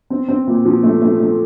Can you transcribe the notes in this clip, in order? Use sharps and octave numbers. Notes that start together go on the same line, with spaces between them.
C4
C4
A#2
F3
A3
A3
A3